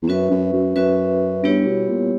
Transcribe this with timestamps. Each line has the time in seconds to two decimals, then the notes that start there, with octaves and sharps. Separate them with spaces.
0.03 E2
0.08 F#2 C#4 F#4 B4 E5
0.30 F#2
0.53 F#2
0.75 F#2 C#4 F#4 B4 E5
1.43 G2 G3 B3 E4 G4 C#5
1.66 B2
1.89 A#2